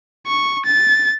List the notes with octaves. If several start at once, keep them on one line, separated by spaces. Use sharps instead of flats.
C#6
A6